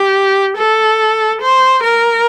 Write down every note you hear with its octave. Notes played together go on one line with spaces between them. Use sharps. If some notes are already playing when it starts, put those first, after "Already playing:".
Already playing: G4
A4
C5
A#4